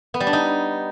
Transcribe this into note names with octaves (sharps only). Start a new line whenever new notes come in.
B3
G3
D4
D#4